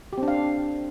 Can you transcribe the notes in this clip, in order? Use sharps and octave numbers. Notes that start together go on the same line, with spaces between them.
G4
C4
D4
F5